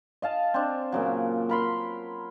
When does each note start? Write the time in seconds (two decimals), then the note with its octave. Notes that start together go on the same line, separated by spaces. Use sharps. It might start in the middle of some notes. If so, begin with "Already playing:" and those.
0.22 D#5 F5 A5
0.54 C4 D4
0.92 A#2 C#3 F#3
1.49 A#4 B5 C6